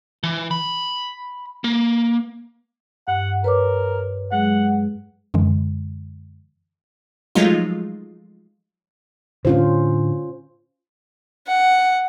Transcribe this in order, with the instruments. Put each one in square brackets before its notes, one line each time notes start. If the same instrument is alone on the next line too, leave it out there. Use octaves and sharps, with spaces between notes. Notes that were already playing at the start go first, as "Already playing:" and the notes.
[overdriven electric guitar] E3
B5
A#3
[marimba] G2 [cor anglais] F#5
[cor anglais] A#4 [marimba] B4 C#5 D6
[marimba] F#3 G#3 G#4 [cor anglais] F#5
[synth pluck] F#2 D3 E3 G#3
[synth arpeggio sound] F3 F#3 G#3 A3 D#4 F4
[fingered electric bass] A2 D3 [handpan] C#4 F4 C5
[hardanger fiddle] F#5